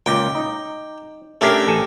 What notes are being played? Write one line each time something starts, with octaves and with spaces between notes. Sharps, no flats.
C#2 A#2 G5 D6
D#4
A3 C#4 D4 G4 A#4 G5
A1 A4 G#5